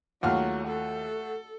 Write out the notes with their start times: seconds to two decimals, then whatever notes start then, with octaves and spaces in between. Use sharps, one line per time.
0.23 D#2 F#3 A3 F4 F#5 F6
0.68 A4